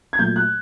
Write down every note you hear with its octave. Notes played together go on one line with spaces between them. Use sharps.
G#6
A#2 F#3 A3 G6
F#6